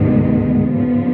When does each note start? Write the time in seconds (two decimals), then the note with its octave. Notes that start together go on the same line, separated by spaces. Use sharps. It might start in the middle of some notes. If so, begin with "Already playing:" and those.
Already playing: D2 G#2 C3 D#3 G#3 B3
0.72 D#2 D3 F3 B3